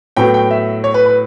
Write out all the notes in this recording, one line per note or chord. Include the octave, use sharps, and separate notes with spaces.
A2 F#3 B3 G5
G5
E5
C#5
B4
B4